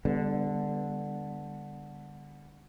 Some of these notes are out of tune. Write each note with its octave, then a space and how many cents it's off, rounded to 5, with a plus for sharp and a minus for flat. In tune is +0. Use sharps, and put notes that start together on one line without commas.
D3 +0 G3 +35 B3 +0